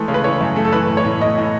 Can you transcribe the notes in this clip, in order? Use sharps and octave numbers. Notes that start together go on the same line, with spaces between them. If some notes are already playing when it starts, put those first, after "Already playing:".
Already playing: E3 G#3 A3
C#3
B4
E3 C#5
F#2
A3
A4
E3 B4
A2
C#5
A2
A2 D#5
A2